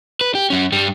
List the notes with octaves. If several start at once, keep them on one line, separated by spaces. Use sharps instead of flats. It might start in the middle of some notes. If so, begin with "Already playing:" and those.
B4
G4
F#2 C#4
G2 G3